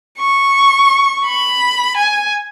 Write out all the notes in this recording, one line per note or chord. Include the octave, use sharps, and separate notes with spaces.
C#6
B5
G#5